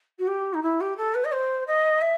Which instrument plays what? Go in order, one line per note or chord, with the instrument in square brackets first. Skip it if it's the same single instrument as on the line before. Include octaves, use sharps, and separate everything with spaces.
[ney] F#4
G4
D#4
E4
G4
A4
B4
D#5
C5
D#5
E5